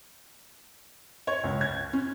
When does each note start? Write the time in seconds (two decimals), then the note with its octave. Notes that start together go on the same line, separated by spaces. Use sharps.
1.27 C#5
1.44 C#2
1.61 G#6
1.93 C#4